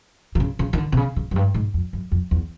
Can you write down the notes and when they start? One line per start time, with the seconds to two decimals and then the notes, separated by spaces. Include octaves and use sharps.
0.35 D3
0.40 C#3
0.59 C#3
0.73 D#3
0.78 D3
0.92 C3
0.97 C#3
1.16 C#3
1.31 F#2
1.36 G2
1.54 G#2
1.74 F2
1.93 F#2
2.12 F2
2.31 E2